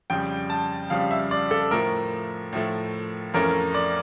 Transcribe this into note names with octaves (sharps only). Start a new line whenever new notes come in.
F2 C#3 G3 G5
A5
F2 C#3 G3 F5
E5
D5
A4
A2 F3 A3 A#4
A2 F3 A3
F2 E3 A3 C#4 A#4
D5